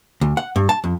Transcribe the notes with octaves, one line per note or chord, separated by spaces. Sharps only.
D2
F#5
G2
A5
F2